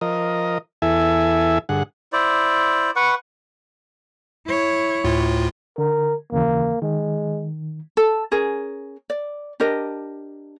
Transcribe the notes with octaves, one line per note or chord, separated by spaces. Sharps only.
F3 A#4 D#5
E2 E4 A4 E5 G#5
G2 D3 G#4 F#5
E4 C5 D5
B4 F#5 C#6
E4 C#5
D2 A2 F4
D3 A#4
D#2 C#3 E3 A#3
D#3 G#3
A4
C#4 G#4 A#4
D5
D4 G4 A#4 D#5